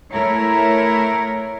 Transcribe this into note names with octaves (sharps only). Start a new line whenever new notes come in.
A3 E4 A#4 C#5